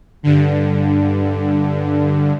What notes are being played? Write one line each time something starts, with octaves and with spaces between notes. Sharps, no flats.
G2 D3